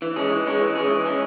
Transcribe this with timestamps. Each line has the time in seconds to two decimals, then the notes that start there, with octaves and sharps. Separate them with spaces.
0.02 E3
0.16 G#3 C#4 G#4
0.31 E3
0.46 G#3 C#4 G#4
0.61 E3
0.75 G#3 C#4 G#4
0.91 E3
1.05 G#3 C#4 G#4